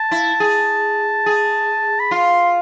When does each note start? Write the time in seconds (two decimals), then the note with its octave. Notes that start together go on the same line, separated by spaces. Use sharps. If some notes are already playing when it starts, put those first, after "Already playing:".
Already playing: A5
0.11 E4
0.40 G#4
1.26 G#4
2.00 B5
2.11 F4 C6